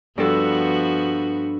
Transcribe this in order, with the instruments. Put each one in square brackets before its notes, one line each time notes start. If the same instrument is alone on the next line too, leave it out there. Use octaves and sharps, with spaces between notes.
[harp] G2 A4 [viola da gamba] F3 B3 F#4